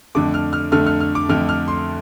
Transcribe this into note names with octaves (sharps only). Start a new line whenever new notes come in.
F2 D3 A3 D6
F6
F6
F2 D3 A3 F6
F6
F6
D6
F2 D3 A3 F6
F6
C6